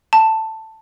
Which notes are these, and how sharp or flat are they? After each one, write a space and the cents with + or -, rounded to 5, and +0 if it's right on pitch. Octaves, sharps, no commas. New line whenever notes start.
A5 +10